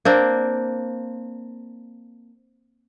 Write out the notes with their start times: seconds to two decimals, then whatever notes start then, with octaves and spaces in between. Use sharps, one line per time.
0.05 A#3 C4 D4